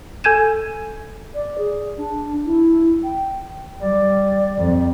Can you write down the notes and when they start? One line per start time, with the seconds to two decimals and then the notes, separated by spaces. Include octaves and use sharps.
0.24 A4 G#5 G6 G#6 D#7 E7
1.34 D5
1.58 G#4
1.98 D4
2.45 E4
3.04 G5
3.81 G3 D5
4.58 F2